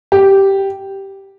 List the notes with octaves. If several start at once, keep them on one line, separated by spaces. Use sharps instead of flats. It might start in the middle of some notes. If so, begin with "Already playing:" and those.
G4